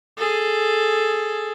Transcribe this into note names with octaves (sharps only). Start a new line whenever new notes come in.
G#4 A4